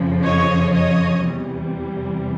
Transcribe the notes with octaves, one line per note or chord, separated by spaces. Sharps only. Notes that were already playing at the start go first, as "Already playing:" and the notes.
Already playing: F2 C#3 F3
C#5 D#5
C#5 D#5
E2 C3 E3 G3